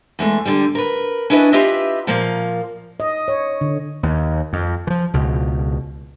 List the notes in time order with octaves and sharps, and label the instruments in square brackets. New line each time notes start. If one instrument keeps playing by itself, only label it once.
[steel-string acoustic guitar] E2 G#3 A3
D3 G3
A#4 B4
C#4 D4 E4 B4 D#5
E4 F4 G4 B4 D#5 E5
A#2 F3 A#3
[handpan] D#5
C#5
D3
[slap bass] D#2
F2
E3 F3
C#2 B2